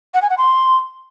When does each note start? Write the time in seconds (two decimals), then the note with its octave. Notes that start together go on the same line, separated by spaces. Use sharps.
0.14 F#5
0.22 G#5
0.30 F#5
0.38 C6